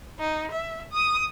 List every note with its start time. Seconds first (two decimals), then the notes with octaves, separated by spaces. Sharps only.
0.19 D#4
0.52 E5
0.92 D#6